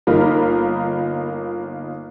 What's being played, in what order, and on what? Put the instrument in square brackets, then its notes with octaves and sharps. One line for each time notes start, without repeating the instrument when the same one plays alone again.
[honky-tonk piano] G1 A#3 D#4 F4 A#4 B5